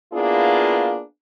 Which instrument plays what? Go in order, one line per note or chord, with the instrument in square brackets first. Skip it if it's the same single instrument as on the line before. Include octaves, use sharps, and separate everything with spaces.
[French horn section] A#3 B3 D4 E4 F4 G#4